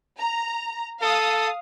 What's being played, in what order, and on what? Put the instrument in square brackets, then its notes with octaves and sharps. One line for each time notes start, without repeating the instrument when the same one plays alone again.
[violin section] A#5
[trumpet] A4 [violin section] F5 D#6